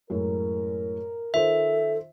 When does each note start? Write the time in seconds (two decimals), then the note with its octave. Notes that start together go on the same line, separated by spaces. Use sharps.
0.10 F#2 A2 G#3 A#4
1.34 D#3 F4 A4 C5 E5